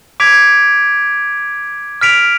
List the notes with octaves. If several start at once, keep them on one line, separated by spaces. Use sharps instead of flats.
D6 G#6 B6 D7 F7
F6 B6 D7 F7